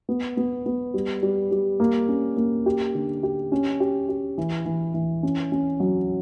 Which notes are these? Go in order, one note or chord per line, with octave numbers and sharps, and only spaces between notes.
B3
B3
B3
G3
G3
G3
A#3
C#4
A#3
G4
D3
G4
C#4
G4
G4
E3
E3
E3
C#4
C#4
F#3